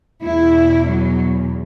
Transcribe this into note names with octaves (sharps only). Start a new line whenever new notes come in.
E2 B2 E4
F#3